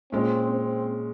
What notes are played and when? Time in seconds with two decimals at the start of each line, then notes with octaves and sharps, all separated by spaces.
0.12 A#2 G#3 C4 C#4
0.50 C4